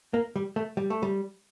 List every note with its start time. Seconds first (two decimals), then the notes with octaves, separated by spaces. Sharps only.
0.14 A#3
0.36 G3
0.56 A3
0.77 G3
0.90 A3
1.03 G3